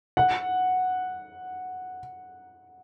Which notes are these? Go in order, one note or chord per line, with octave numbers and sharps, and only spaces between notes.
F#5